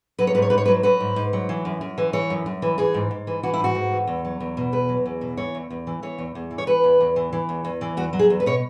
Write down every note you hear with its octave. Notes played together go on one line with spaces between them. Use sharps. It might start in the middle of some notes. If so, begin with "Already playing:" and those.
F#3 B4
C#5
G#2 B4
C#5
G#2 B4
C#5
F#3 B4
F#3 B4
G#2
G#2
F#3
E3
F#2
F#2
E3
E3 C#5
F#2
F#2
E3
E3 G#4
G#2
G#2
E3
E3 F#4
E4
G#2 F#4
G#2
E3
E2
F#3
E2
B2
E2 B4
F#3
E2
B2
E3 C#5
E2
E2
E3
E3 C#5
E2
E2
E3
C#5
E3 B4
E2
E2
E3
E3
E2
E2
E3
E2 F#4
F#3
G#4
E2
B4
B2 C#5